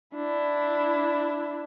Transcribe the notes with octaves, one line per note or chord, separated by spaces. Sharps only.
D4 E4